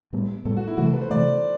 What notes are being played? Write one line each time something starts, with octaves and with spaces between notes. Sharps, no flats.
A2 G3 B3
A2 G3 B3 A4
F#4
E4
C3 E3 A3 F#4
A4
B4
C5
C3 E3 A3 D5